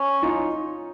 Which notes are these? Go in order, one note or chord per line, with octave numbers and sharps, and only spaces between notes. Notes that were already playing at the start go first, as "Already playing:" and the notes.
Already playing: C#4
D#4 F4